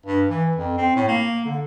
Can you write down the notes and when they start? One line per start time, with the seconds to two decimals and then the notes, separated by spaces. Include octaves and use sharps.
0.05 G2
0.29 E3
0.56 F2
0.77 C4
0.96 A2
1.08 A#3
1.45 D3